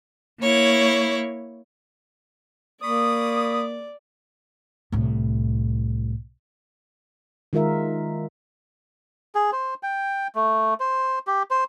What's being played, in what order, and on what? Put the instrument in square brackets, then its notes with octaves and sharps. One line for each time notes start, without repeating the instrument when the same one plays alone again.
[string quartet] A#3 E4 C#5
[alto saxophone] A#3 [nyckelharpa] D5 [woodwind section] B5 C#6 D#6
[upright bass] C2 A2
[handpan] D#3 G#3 F4 A#4 E5
[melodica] G#4
C5
G5
A3
C5
G4
C5